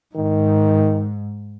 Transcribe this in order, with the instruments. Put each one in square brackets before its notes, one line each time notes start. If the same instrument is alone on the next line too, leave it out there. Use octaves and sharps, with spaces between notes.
[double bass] G#2 [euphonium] D#3